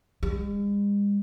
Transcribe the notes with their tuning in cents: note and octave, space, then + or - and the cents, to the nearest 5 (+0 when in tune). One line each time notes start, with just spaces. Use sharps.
G#3 -45